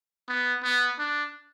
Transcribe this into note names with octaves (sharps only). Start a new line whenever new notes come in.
B3
B3
D4